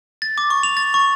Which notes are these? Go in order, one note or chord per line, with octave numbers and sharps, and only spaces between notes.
A6
D6
C#6
F7
A6
C#6